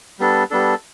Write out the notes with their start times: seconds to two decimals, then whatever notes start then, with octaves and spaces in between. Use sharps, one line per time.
0.19 G3 B3 D4 A4
0.50 G3 B3 D4 A4